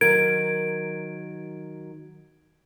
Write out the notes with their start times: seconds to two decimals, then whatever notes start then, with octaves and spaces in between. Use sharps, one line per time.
0.01 D#3 F#3 A#4 G#6 D7